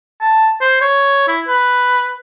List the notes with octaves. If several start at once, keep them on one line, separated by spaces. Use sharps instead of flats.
A5
C5
C#5
E4
B4